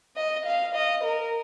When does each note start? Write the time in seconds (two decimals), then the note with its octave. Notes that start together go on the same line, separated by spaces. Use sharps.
0.16 D#5
0.45 F5
0.74 D#5
1.03 A#4